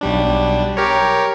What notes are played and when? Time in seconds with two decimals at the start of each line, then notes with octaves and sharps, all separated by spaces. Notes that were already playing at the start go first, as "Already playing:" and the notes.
0.01 B1 G3 D4
0.77 G4 A#4 C#5